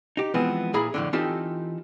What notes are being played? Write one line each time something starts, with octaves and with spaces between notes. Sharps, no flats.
D#4 G4
E3 F3 G#3 B3 C4
A#2 E4 G#4 A#5 B5
F2 A2 D3
E3 C4 D#4 F4 G4 A4